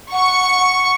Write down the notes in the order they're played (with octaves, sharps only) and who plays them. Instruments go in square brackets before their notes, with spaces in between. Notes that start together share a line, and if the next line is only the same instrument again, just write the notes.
[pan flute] F#5 [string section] C#6